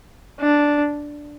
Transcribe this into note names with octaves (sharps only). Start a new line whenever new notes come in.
D4